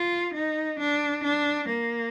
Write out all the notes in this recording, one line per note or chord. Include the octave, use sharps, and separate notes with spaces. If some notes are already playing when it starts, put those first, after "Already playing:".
Already playing: F4
D#4
D4
D4
A#3